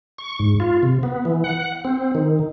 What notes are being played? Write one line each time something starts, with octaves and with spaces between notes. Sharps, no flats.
C#6
G#2
F4
C3
B3
E3
F#5
C4
D#3